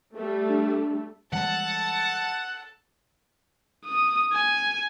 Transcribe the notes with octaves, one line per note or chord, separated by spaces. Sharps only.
G3 A3
D4
E3 G3 G#3 A4 F#5 A5
D#6
G#5